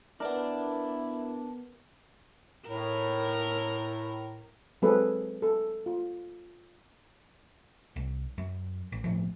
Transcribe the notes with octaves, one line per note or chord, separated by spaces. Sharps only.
B3 D4 E4 A#4 D5
A2 A#4
F#3 G#3 C4 G#4 A4 B4
A4
F4
C2
F#2
A1
G1 A2 F3